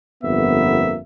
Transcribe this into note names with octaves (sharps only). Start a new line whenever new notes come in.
G1 F2 A#3 B3 E5